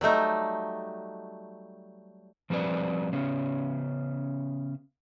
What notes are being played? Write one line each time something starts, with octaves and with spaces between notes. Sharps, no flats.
F#3 G3 A3 D#4
F3 G3 C4 B4 D5
C#3 B3 C#4